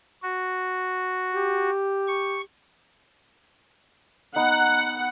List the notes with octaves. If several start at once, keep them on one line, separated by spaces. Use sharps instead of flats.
F#4
G4
C#6
B3 D#4 F#5